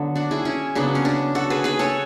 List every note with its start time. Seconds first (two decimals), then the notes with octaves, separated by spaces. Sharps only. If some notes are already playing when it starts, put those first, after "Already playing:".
Already playing: D3 F#3 B3
0.15 D4 F#4
0.31 E4 G#4
0.45 C#4 E4
0.75 C#3 F#3 B3 D4
0.95 C#4
1.05 D4
1.35 F#4 A4
1.50 G#4 B4
1.64 G#4 B4
1.79 A4 C#5